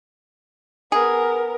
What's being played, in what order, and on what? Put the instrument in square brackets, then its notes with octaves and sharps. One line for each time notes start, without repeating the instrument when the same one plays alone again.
[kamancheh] B3 A#4 [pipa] G#4